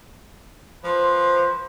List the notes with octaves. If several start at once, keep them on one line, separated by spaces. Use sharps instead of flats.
F3 B4 C5